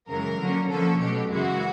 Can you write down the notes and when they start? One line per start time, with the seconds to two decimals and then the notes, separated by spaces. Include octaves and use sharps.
0.09 F#2 C#3 E3 G#3 A#4
0.39 D3 F#3 A#3 C#4
0.70 D3 F3 A#3 C#4 A4
1.00 B2 F#3 A3 G4
1.31 F#2 C#3 E3 G#3 F#4